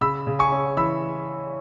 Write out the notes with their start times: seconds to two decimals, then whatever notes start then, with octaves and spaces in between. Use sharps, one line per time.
0.01 C#3 B5 E6
0.27 C#3
0.39 G#5 C#6
0.52 C#4
0.77 E3 B5 E6